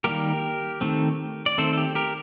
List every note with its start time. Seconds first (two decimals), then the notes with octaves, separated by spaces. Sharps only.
0.04 D#3 G3 A#3 G4 A#4
0.81 D#3 A3 C4
1.46 D5
1.58 D#3 A3 C4 A4 C5
1.73 A4
1.77 G4
1.95 G4 A#4